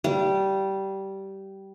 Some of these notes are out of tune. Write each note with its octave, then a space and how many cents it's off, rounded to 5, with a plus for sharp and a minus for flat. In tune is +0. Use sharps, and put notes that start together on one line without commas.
G3 -15 F5 -35